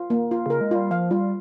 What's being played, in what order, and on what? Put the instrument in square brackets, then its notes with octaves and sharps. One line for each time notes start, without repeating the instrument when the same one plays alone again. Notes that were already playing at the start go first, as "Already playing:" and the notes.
Already playing: [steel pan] F4
A#3
F4
[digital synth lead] C#3 [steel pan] A#4
[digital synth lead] G#3
[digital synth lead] G3 [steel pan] F4
[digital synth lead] F3 [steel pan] F5
[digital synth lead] G3 [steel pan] F4